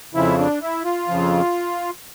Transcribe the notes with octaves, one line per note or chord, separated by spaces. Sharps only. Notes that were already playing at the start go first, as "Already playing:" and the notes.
F2 C#3 F3 E4
D4
E4
F4
F2 C#3 F3